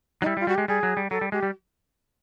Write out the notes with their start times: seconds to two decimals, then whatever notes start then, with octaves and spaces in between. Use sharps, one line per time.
0.22 F#3 D#4
0.26 G3 E4
0.37 G3
0.40 F4
0.47 G3 F#4
0.55 G#3 G4
0.68 G3 G#4
0.83 F#3
0.97 G3
1.11 F#3 A4
1.21 G3
1.32 G#3 G4
1.43 G3